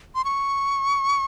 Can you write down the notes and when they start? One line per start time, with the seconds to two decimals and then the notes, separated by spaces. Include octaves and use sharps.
0.15 C6
0.25 C#6